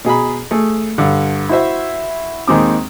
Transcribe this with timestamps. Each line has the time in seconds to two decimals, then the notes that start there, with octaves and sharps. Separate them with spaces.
0.05 B2 G#4 A#5 B5
0.51 A3 G#4
0.98 G2 D3
1.49 E4 F#4 C5 E5
2.48 D#2 D#3 G#3 C4 D6